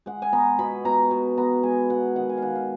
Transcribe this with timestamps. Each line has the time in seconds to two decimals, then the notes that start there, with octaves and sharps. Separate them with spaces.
0.06 G#3 F#5
0.22 G#5
0.33 B3 A#5
0.59 B2 B5
0.85 B2 A#5
1.11 B2
1.38 B3 A#5
1.63 G#3 G#5
1.90 B2 F#5
2.15 D#3 F#5
2.30 G#5
2.37 D#3 F5 F#5
2.55 F5